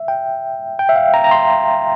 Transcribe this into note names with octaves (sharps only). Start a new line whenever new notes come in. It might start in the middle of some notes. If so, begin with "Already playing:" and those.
Already playing: E5
G5
G5
E5
F5
A#5
A#5
C6